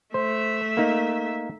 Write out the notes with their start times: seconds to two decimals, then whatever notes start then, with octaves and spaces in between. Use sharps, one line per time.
0.14 A3 C5 E5
0.77 A#3 D#4